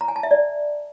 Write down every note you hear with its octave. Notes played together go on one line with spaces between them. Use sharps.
A#5
G#5
A5
E5
D5